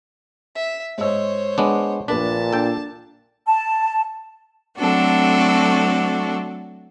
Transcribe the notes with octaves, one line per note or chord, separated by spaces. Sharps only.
E5
G#2 C5 C#5 D#5 E6
G#3 B3 D4
A#1 A#2 D4 B4 A5 B6
D4 A4 G5
A5
F#3 A3 C4 D4 F#4 A4